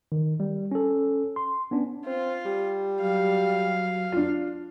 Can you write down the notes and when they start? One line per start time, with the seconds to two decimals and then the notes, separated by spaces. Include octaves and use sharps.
0.12 D#3
0.40 G3
0.72 C#4 A4
1.36 C6
1.71 B3 C#4 D4
2.06 C4 F4
2.45 G3
3.02 F#3 F5
4.12 D4 F4